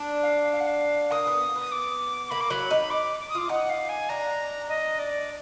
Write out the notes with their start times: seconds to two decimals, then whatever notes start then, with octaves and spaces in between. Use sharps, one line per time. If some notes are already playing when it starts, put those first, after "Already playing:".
Already playing: D4
0.23 F5
0.52 F5
0.60 F#5
0.68 F5
1.11 A#3 D#6
1.27 B3
1.56 B3
1.61 D#6
1.72 D6
2.30 A#3 B5
2.41 D6
2.50 F#3 B5
2.71 D#4
2.91 D6
3.20 D6
3.29 D#6
3.35 F4 D6
3.49 D#4 F#5
3.70 F5
3.89 G#5
4.09 D4 A#5
4.69 D#5
4.99 D5